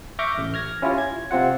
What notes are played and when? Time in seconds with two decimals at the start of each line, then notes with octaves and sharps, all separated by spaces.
0.19 E5 C#6 D6 F6 G6 A#6
0.38 A1
0.54 F6 G#6 A#6
0.82 C#4 E4 F4 G4
0.98 G#6
1.31 C3 C4 F4 F#5